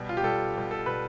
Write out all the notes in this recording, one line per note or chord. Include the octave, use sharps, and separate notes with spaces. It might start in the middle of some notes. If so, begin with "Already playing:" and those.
Already playing: B2 G3
F4
G4
B2 G3 A4
B2 G3
A4
B2 G3 B4